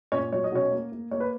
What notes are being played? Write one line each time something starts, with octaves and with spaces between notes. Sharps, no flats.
A#2 C#4 C#5
F#3 C#5
D#5
B2 C#4 C#5
A#3
A#3
A#3 C#5
B4